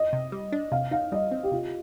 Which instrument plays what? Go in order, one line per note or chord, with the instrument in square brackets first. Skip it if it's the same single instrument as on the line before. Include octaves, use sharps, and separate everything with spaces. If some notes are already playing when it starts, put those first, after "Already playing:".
Already playing: [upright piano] D#5
[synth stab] C3
G3
D4
[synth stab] C3 [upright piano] F5
[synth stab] D#4 [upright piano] F5
[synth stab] G3 [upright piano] D#5
[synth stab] C4
[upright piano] G4
[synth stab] C3 [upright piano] F4